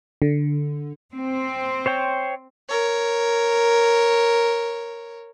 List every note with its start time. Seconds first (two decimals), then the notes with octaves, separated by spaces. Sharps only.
0.22 D3
1.14 C4
1.86 C5 C#5 G5
2.70 A#4 C#5